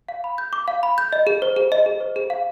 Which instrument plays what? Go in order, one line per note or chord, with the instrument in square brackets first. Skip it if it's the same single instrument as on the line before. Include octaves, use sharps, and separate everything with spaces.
[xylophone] F5
B5
G6
D6
F5
B5
G6
D#5
G#4
C5
G#4
D#5
G#4
C5
G#4
F5